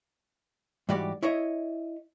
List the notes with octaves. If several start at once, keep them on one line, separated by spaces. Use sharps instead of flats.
G#2 E3 G3 F#4 G4 D5
E4 C#5 D#5 E5